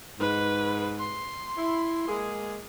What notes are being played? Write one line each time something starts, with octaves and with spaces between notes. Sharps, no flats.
G#2 B4
C6
E4
G#3 A#3 G#4